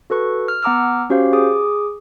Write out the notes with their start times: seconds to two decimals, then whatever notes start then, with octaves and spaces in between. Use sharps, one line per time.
0.10 F#4 A4 B4 C#6
0.48 F6
0.63 B3 F#5 A#5 D6 E6 F6
1.10 C#4 F#4 G4 C5 F5
1.33 G#4 D6 D#6